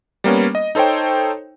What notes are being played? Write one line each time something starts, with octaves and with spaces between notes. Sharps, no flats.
G3 A#3 B3 C#4
D#5
D#4 A4 C5 C#5 G5